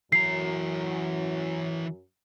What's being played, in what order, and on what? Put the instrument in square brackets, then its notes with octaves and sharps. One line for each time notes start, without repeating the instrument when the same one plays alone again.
[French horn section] F#2 F#3 [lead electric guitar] E3 A#5 [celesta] C7